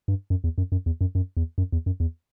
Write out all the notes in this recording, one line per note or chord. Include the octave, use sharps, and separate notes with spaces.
G2
F#2
E2
F#2
F#2
E2
F#2
F#2
E2
F#2
E2
F#2
E2